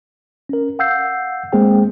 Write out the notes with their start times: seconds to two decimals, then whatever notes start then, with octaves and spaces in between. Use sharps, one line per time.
0.49 C#4 A#4
0.79 F5 F#5 E6 G6 C7
1.52 G#3 A#3 C4 G#4 C5 G5